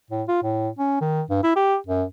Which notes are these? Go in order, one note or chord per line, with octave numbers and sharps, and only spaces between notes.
A2
F4
A2
C#4
D#3
G2
E4
G4
F#2